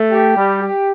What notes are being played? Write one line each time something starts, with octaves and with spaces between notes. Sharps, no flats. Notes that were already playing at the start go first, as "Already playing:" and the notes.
Already playing: A3
G4
G3
G4